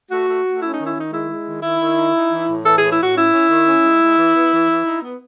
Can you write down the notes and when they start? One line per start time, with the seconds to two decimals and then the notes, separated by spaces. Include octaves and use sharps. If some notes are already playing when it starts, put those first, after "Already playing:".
0.10 A3 F#4
0.27 A3
0.44 A3
0.61 C#4 E4
0.73 D#3 D#4
0.86 E4
0.94 D#3 D#4
1.11 G#3 E4
1.28 G#3
1.45 D#3
1.62 D#3 E4
1.79 D#3
1.96 D#4
2.13 D#4
2.31 E3
2.47 A2
2.64 E3 A4
2.77 A2 G#4
2.90 E4
2.98 A2 F#4
3.15 C#4 E4
3.32 C#4
3.48 D#3
3.66 C#4
3.82 G#3
3.99 G#3
4.17 E3
4.33 B3
4.51 E3
4.68 E3
4.84 D#4
5.01 B3